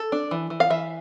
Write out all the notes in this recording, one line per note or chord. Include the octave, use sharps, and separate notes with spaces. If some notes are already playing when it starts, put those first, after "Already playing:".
Already playing: A4
D4
E3
E3
F5
E3 E5